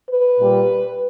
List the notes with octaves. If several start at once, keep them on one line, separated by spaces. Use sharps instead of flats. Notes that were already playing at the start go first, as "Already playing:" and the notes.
B4
A#2 G3